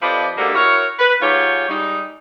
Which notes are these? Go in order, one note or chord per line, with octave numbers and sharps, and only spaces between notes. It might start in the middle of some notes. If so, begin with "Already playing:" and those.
F2 F3 G4 B4 D5 D#5
D2 G#2 D3 A#3 F#4 G4
E4 F#4 A#4 C#5
B4
G#2 F4 G4 C#5
G3 G#3 D#4